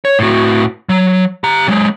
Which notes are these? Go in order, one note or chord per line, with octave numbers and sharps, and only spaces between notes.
C#5
A2 F#4
F#3
G4 A#5
F#3 G#3